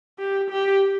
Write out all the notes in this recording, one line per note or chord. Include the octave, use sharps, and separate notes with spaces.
G4
G4